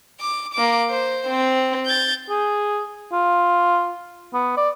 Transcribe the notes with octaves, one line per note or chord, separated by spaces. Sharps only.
D6
A#3 D6
C5
C4
G6 A6
G#4
F4
B3
D5